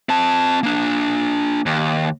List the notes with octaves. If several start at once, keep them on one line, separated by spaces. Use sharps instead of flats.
C4 A5
A#3 D4
D#2